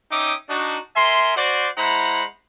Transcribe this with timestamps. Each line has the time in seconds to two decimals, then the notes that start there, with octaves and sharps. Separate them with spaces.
0.11 C#4 D#4 E5 G5 D6 D#6
0.50 D4 D#4 F#4
0.96 A#4 E5 G#5 C6
1.37 F#4 C5 D5
1.78 G#3 E4 C5 F#5 A#5 B5